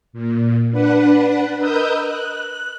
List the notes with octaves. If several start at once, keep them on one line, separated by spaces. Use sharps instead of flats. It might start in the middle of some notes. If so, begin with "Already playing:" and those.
A#2
D4 B4 F#5
A#4 B4 D#5 D#6 E6 G6
F#6